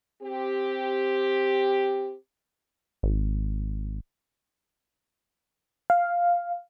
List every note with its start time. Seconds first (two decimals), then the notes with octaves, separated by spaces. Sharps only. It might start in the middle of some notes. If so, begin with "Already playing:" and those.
0.23 C4 G4
3.03 G#1
5.90 F5